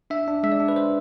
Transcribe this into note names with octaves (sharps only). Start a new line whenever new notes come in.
D4 E5
D4
G#3 E5
D5
D4
B4
C5